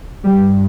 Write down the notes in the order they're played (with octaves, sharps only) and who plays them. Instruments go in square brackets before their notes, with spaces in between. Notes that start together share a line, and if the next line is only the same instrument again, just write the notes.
[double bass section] G2 G3